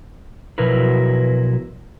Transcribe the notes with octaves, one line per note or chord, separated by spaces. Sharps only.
B2 F3 F#3 E4 A#4 B4